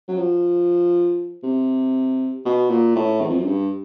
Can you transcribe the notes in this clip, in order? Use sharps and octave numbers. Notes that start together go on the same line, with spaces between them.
F#3
F3
C3
B2
A#2
A2
E2
F2
F#2
G2